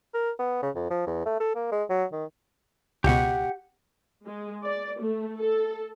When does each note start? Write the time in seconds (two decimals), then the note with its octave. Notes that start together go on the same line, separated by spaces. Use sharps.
0.14 A#4
0.39 B3
0.62 C#3
0.75 F2
0.90 F3
1.06 E2
1.26 A3
1.40 A4
1.55 A#3
1.72 G#3
1.90 F#3
2.12 D#3
3.04 C#2 B2 G4 F#5
4.26 G#3
4.64 D5
5.01 A3
5.39 A4